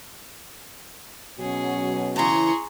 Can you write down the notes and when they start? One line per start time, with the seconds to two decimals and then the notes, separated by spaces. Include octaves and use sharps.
1.39 B2 F#3 C#4 G#4
2.16 C#3 E3 G#4 A#5 C6 C#6